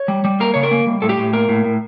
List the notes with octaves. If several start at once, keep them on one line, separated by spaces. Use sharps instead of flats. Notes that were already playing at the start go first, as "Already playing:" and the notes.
Already playing: C#5
G3
G3
A#3 A#4
C#3 C#5
A#4
A#3
G3
A2 A4
G4
A2
A#3 A#4
A2
A2